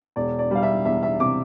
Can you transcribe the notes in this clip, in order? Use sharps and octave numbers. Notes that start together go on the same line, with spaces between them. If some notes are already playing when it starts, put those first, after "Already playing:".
E1 D5
D5
G3 F5
E5
E2 E5
E5
C3 D6